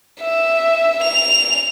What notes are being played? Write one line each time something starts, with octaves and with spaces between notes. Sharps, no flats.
E5
F7